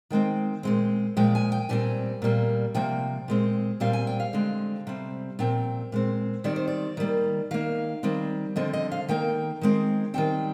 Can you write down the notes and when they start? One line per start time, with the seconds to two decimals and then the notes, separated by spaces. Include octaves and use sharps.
0.10 D#3 G#3 C4 G5
0.63 A#2 G#3 C4
1.17 A#2 F3 G#3 G5
1.35 G#5
1.52 G5
1.69 A#2 G3 C4 G#5
2.22 A#2 G3 A#3
2.74 C3 F3 A#3 G5
3.28 A#2 G#3 C4
3.80 A#2 G3 C4 F5
3.93 G#5
4.07 G5
4.20 F5
4.33 D3 G#3 C4
4.87 C3 G3 C4
5.39 A#2 F3 C4 G5
5.92 A#2 G#3 C4
6.44 D#3 G3 C4 D5
6.56 C5
6.68 D5
6.97 D#3 G3 A#3
7.51 D#3 A#3 F5
8.03 D#3 G3 C4
8.56 D3 F3 C4 D#5
8.73 D#5
8.91 F5
9.08 D#3 A#3 G5
9.61 D#3 G#3 C4
10.14 D#3 G3 C4 G5